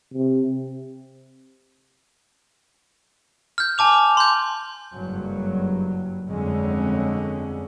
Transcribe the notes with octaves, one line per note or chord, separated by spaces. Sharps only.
C3
F6 G6
G#5 A5 D6 F7
C6 G6
F#1 G2 F#3
G1 F2 D3 G#3 C#4